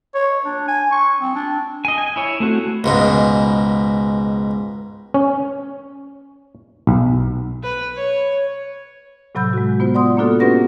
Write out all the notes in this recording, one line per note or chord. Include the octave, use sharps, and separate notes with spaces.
C#5
D4
G#5
C#6
C4
D4
D#5 G#5
G#5
E4 C#5
A3 C4 F#4
C#2 G#2 B2
C#4
B1
B4
C#5
A2 C3 F#3 B5 E6 G6
G#3 F#4
B3 F4 C5
D5 F#5 C6 D#6
A#3 B3 D4 F4 F#4 A4
B3 C#4 G4 B4 F#5 A#6